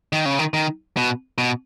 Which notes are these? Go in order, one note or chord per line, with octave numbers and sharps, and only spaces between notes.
D#3
C#3
D#3
D#3
B2
B2